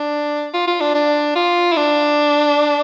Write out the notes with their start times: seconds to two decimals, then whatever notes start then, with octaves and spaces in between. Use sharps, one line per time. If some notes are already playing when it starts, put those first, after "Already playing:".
Already playing: D4
0.54 F4
0.68 F4
0.81 D4
0.95 D4
1.35 F4
1.72 E4
1.77 D4